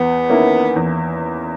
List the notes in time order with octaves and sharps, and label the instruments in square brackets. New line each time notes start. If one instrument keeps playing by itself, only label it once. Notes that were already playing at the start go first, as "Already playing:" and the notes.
Already playing: [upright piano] E2 [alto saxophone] B3
[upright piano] D#3 A#3 C#4 E4
E2